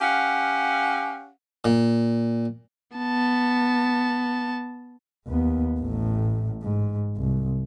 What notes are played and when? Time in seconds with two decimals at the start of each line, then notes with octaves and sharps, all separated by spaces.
0.01 C#4 G4 F5 F#5
1.65 A#2
2.97 B3 A5
5.27 D#2 B3
5.80 A1 A2
6.63 G#2
7.17 C2